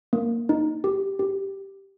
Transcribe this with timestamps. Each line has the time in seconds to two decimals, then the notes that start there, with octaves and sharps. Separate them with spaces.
0.13 A#3
0.49 D#4
0.84 G4
1.19 G4